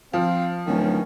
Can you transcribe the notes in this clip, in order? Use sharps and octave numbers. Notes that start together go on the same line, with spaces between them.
F3 C4 F5
D1 D#3 E3 C#4